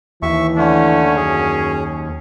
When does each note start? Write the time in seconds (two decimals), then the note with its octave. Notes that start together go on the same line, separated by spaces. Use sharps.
0.22 D#2 E3 E5 C#6
0.57 D3 A3 C#4
1.17 F#2 G#4